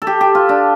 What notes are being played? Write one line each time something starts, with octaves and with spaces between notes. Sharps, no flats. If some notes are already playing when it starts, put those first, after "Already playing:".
A4
G4
G4
F4
D4